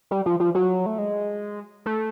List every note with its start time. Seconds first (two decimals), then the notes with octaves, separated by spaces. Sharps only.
0.11 G3
0.26 F3
0.40 F3
0.55 F#3
0.86 A3
0.98 G#3
1.86 A3